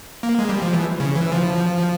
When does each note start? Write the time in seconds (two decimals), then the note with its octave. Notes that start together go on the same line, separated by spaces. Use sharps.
0.23 A#3
0.39 G#3
0.49 G3
0.62 F3
0.73 E3
1.00 C#3
1.15 E3
1.32 F3